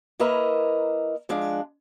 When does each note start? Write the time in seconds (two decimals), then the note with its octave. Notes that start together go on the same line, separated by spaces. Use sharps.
0.20 A#3 E4 A#4 B4 D#5 A#5
1.29 F3 G#3 D4